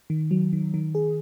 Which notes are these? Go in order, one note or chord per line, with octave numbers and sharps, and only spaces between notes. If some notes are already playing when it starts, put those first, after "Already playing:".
D#3
F#3
D#3
D#3
G#4